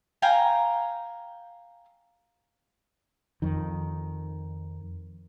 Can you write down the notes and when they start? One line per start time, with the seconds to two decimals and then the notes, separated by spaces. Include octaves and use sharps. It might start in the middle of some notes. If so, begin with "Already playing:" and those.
0.22 F5 G5 G#5 A#5
3.42 F2 D#3